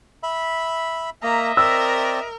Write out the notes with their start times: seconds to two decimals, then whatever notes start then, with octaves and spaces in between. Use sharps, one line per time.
0.23 E5 B5
1.23 A#3 D#5 E5 A#5
1.57 C4 A#4 D5 E6